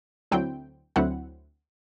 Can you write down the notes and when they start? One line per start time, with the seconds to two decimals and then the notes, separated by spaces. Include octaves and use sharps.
0.31 D2 D3 F#3 C4 E4 G5
0.96 D2 D3 F#3 C4 E4 F#5